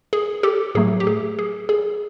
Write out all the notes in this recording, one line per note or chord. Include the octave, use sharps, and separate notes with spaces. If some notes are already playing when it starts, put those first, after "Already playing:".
G#4
G4 A4
A2 F#3 A3 G#4
G4
G#4
G#4
G#4